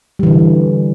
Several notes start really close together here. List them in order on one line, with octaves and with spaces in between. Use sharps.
G3 E3 D3